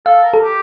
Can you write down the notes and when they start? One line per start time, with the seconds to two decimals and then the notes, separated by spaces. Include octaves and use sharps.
0.06 A4 F5
0.24 A#4
0.34 A4
0.43 G4